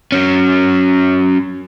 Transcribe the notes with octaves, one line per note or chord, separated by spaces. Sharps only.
F#3 C#4